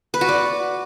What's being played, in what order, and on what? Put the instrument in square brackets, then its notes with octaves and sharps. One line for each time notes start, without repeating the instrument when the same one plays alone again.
[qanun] B4
F#4
D5